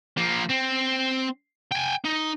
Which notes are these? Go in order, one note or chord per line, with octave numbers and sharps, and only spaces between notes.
F3 A#3
C4
G5 G#5
D#4